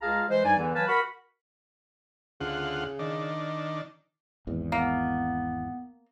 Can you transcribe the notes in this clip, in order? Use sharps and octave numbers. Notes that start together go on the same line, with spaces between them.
C#2 F4 G#4 F5 A5 A#5
E3 G#3 C5
G2 G3 D#4 D5 G#5
E2 D3 E3
E3 F#3 B4 F5 G#5 A5
F#4 A#4 B5
D2 C#3 F4 F#5
D#3 D4
G#1 E2
A#3 B3